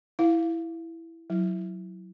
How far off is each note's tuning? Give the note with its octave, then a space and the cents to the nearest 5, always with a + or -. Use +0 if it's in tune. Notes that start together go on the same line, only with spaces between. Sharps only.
E4 +0 F5 +0
F#3 +0 E4 +0